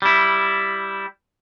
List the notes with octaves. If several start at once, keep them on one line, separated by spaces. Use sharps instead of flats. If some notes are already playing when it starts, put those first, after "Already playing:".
G3 E4